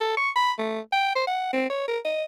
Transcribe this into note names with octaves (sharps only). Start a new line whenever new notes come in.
A4
C#6
B5
A3
G5
C5
F#5
C4
C#5
A#4
D#5